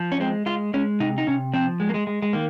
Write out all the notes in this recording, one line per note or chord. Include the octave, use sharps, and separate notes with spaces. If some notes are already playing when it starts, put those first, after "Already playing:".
Already playing: F3
C#4
G#3 C4
G#3 F4
G#3 C#4
C3 D#4
D#4
C3 C#4
F3 C4
G#3
A#3
G#3
G#3
G#3
D#3 A#3